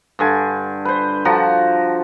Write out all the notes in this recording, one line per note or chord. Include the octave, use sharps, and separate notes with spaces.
G2 D3 G#5
B4 C5
D3 F3 F#4 A#5